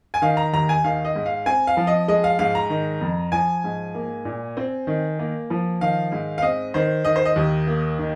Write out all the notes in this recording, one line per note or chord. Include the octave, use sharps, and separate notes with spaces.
G#5
D#3 F5
A#5
D#2 A#5
G#5
D#3 F5
D#5
G#2
F5
C4 G#5
F5
F3
D#5
G#3 D#5
F5
G#2 F5
A#5
D#3
F2
F3 G#5
G#2
A#3
A#2
C4
D#3
A#3
F3
D#3 F5
G#2
F5
C4 D#5
D#3 C5
D#3 D#5
C5
D#5
D#2
A#3
D#3